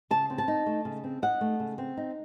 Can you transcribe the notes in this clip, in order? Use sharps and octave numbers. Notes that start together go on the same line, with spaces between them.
C#3 A5
C4
A5
D#4
A3
C#3
C4
D#4 F#5
A3
C#3
C4
D#4